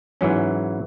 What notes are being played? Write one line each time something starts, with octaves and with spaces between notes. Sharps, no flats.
G#2 E3 F#3 C#4